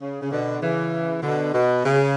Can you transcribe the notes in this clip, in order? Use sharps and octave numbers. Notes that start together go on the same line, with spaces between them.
C#3
C#3
B2 D3
C#3 E3
B2 D3
B2
C#3